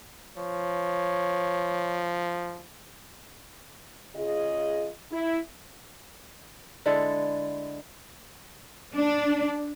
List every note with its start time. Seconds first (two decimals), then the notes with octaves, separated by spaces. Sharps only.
0.37 F3 C#5
4.16 C#3 F4 G#4 D#5
5.11 E4
6.86 D3 G#3 E4 A4
8.94 D4